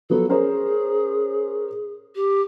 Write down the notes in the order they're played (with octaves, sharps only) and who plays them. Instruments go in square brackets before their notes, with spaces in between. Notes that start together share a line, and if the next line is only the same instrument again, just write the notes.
[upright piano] F3 F#3 B3 [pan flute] A4
[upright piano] C#4 A#4 C5 [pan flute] G#4
[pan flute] G4